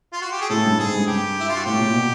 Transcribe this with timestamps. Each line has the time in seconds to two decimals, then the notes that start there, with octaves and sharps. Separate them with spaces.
0.13 F4
0.22 F#4
0.31 G4
0.41 G#4
0.50 A2 A4
0.64 G2
0.79 G#2 G#4
0.93 G2
1.07 G2 G4
1.40 E4
1.49 F4
1.56 F#4
1.65 A2 G4
1.79 A#2
1.94 B2